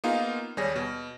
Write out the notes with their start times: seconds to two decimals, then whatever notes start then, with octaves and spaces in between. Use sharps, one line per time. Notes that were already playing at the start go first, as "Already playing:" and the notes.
0.04 A#3 B3 D#4 F4 G#4 F5
0.57 D#2 G3 G#4 C#5 A#6
0.76 B2